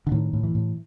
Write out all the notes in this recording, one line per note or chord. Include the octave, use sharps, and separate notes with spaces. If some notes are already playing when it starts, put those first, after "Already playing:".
D3
A2 D#3
A2
E3
A2